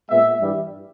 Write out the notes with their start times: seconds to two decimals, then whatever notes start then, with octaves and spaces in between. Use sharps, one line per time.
0.09 A#2 G#3 B3 E5
0.40 G2 E3 G3